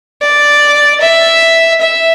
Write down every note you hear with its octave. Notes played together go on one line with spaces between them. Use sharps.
D5
E5
E5